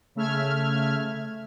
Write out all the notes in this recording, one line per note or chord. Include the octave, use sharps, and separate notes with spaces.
C#3 A3 E5 F6 G#6